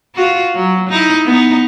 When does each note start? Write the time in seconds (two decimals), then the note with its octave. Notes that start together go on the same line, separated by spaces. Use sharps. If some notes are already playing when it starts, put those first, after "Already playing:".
0.15 F4 F#4
0.55 F#3
0.89 D#4 E4
1.26 B3 D#4